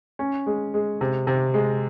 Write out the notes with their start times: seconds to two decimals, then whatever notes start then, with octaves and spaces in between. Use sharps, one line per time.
0.19 C#4
0.46 G#3
0.74 G#3
1.01 C3
1.27 C3
1.54 G#3